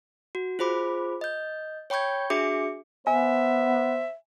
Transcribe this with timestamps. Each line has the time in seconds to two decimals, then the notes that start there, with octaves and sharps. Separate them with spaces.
0.35 F#4
0.59 F4 G#4 C5 B5 D6
1.21 D#5 G6
1.90 C#5 G5 B5 C#6 G6 G#6
2.30 D4 F#4 G#4 E5 D6 C#7
3.07 B3 C5 E5 G#5